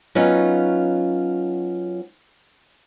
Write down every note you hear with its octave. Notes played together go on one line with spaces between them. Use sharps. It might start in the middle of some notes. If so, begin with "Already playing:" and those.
F#3 B3 C#4 D#4 F4 F#4